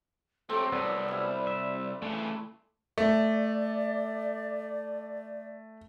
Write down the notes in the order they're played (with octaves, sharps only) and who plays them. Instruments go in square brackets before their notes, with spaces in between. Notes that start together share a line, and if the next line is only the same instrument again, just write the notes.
[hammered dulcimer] F#3 C4 [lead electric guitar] A3 G4 [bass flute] A4
[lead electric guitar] C2 [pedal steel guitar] B3 A4 [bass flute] D5
[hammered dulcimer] G3 E4
[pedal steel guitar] E5
[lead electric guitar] C#3 E3 [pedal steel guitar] A3
[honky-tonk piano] A3 [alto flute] D5